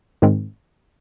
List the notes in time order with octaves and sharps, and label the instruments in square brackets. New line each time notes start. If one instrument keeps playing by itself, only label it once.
[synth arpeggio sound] G#2 D#3 G#3 C4